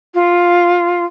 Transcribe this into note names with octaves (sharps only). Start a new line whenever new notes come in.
F4